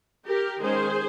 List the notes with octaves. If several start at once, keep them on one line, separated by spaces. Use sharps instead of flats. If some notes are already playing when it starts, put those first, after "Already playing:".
G4 A#4
D#3 G#3 C#4 G#4 C5